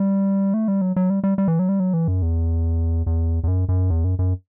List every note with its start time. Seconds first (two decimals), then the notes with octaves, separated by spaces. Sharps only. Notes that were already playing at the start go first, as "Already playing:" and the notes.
Already playing: G3
0.54 A3
0.68 G3
0.82 F#3
0.96 F#3
1.10 G3
1.24 G3
1.38 G3
1.48 E3
1.59 F#3
1.69 G3
1.80 F#3
1.93 E3
2.08 F#2
2.22 E2
3.06 E2
3.44 E2
3.48 F#2
3.69 F#2
3.90 E2
4.04 F#2
4.19 F#2